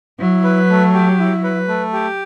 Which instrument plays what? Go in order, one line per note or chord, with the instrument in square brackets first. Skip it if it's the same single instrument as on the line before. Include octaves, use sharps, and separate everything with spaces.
[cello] F#3 [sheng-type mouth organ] E4
[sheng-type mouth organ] B4
A3
G4
E4
B4
A3
G4